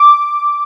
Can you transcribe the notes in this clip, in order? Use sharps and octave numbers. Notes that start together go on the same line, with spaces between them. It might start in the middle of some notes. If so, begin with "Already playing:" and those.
Already playing: D6